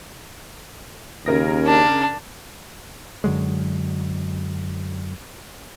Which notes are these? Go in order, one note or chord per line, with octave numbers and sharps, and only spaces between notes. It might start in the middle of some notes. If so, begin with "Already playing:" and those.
D#2 C#3 A#4 A#6
D4
F#2 D3 F#3 G#3